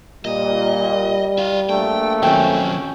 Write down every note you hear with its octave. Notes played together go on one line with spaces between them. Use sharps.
A#2 G3 D#5
E4 F5
A#1 A3 G5
F2 D#3 F#3 C#4 G5